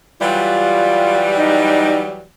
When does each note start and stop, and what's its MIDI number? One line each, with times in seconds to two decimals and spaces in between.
0.21 2.24 52
0.21 2.24 54
0.21 2.24 55
0.21 1.30 65
1.38 2.00 63